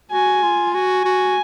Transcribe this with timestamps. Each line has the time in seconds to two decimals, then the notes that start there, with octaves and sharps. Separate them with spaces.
0.11 F#4 G#5
0.43 F4
0.75 F#4 G#5
1.05 F#4